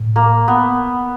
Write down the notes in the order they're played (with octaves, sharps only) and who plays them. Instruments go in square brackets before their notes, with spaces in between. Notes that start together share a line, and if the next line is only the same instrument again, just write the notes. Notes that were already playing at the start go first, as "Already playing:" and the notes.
Already playing: [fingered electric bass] A2
[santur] A#3
B3